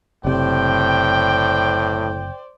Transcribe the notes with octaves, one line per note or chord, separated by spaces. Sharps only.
F#1 A2 C3 C5 D5 G5